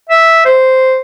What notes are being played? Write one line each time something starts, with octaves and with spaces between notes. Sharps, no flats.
E5
C5